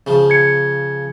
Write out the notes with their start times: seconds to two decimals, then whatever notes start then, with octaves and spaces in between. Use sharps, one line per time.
0.07 C#3 F3
0.30 G#6 C#7